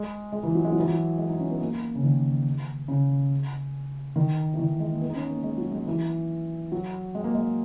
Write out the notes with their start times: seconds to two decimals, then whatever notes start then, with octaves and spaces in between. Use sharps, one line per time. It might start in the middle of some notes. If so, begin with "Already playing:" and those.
Already playing: G#3
0.32 G#3
0.43 E3
0.55 F#3
0.64 G#3
0.72 F#3
0.80 E3
0.87 F#3
1.18 G#3
1.29 D#4
1.40 C#4
1.50 B3
1.61 A#3
1.95 C#3
2.03 D#3
2.88 C#3
4.16 D#3
4.54 E3
4.59 D#3
4.80 G#3
4.91 A#3
5.01 B3
5.10 D#4
5.15 C#4
5.29 A#3
5.43 G#3
5.58 F#3
5.72 G#3
5.87 E3
6.72 F#3
7.15 G#3
7.24 A#3
7.35 G#3